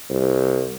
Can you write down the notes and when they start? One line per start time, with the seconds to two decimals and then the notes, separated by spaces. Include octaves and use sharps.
0.10 C2